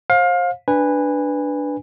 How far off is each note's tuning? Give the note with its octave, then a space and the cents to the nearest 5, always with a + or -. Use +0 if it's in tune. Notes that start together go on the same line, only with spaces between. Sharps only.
C5 +30 F5 +25
D4 +0 B4 +0 G#5 -20